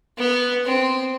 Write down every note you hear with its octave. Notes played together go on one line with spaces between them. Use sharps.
B3
C4